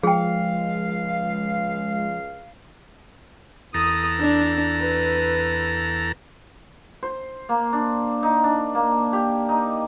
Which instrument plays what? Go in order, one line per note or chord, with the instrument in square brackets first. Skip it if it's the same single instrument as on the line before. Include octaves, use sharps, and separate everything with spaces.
[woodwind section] C#2 F5 [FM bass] F3 [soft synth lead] G#3 [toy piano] G#4 G5
[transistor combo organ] E2 A4 A#5 [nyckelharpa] D#6
[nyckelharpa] D4
B4
[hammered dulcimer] C5
A#3
D4
D#4
D4
A#3
G4
D#4